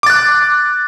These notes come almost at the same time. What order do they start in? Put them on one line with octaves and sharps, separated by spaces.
D6 A6 F#6